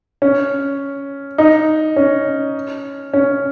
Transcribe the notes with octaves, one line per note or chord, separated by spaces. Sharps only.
C#4
D#4
C#4
C#4